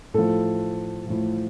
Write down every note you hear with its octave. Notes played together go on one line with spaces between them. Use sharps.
A2 F3 A4
A2 F3